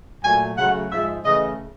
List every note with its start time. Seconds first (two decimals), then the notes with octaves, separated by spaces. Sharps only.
0.24 A#2 F#3 A3 G#5
0.57 C#3 F#3 A3 F#5
0.92 G#2 F3 G#3 E5
1.25 C#3 E3 A3 D#5